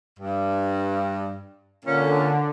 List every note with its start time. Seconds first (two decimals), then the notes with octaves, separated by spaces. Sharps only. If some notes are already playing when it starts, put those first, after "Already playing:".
0.19 G2
1.85 A#2 D3 C#4